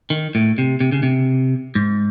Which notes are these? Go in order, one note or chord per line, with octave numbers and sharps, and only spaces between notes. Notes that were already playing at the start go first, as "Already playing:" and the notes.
D#3
A2
C3
C3
C#3
C3
G#2